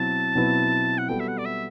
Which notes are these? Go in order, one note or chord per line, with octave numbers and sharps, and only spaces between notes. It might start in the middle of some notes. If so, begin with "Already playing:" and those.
Already playing: B2 F#3 C4 E4 A5
B2 F#3 C4 E4 B4
F#5
G3 B3 F#4 A4 G5
E5
F#5
D5
E5